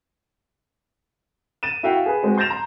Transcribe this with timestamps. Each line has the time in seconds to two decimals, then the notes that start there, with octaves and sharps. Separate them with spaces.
1.63 A6 D#7 E7
1.83 E4 F#4 E5 F5 G5
2.06 G#4 B4
2.23 G#3 C4 F#4
2.38 C6 G6 A6 A#6 E7 F7
2.50 A#5